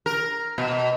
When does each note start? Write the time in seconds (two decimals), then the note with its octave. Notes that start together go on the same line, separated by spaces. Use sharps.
0.06 A#4
0.58 B2